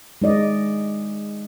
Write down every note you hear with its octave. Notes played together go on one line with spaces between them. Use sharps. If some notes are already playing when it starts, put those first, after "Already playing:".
G#3 D#4 D5 D#5